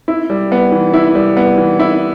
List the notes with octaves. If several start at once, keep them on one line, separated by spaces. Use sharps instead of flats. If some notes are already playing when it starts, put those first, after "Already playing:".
E4
G3
B3
E3
E4
G3
B3
E3
E4